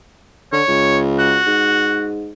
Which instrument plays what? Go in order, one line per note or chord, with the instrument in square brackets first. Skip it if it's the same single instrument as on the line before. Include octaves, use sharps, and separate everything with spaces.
[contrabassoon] D3 [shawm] C#5
[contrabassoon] C#2
[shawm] F#4
[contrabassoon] G#2